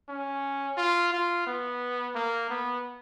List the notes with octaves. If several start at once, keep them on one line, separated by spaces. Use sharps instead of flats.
C#4
F4
F4
B3
A#3
B3